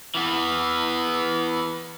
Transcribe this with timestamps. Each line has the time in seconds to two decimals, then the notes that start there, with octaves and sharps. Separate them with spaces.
0.15 E3 B3